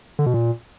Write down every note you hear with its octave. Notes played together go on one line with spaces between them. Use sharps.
D3
B2
A#2